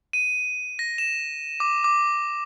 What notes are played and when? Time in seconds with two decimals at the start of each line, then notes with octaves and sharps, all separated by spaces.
0.13 D#7
0.79 A#6
0.98 E7
1.60 D6
1.84 D6